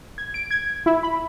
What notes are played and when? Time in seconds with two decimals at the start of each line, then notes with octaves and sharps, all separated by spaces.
0.18 G#6
0.34 D7
0.51 G#6
0.86 E4
1.03 B5